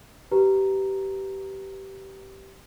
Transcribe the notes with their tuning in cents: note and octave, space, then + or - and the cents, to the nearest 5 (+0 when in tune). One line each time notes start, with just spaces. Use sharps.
G4 -20 B4 +0 A#5 -5